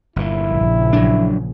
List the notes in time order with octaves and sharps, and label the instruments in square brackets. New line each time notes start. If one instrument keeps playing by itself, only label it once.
[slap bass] G1 A#2 [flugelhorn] E4
[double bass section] A#1 C#3
[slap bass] F#3 D4